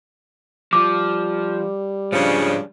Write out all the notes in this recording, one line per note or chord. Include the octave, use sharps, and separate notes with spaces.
F3 G3 D6
G#2 C#3 F3 D4